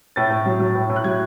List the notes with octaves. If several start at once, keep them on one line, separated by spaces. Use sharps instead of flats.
A2 A6
A2
F#3
F#3
A2
A2
F#6
F#3 G#6